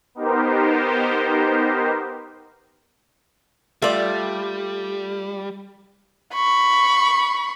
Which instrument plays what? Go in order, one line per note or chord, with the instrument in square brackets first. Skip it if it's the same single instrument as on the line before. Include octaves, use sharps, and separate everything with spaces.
[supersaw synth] B3 D#4 G4 A#4 C5
[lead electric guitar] G3 [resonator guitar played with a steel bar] A3 [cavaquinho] F4 D5
[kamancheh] B5 C#6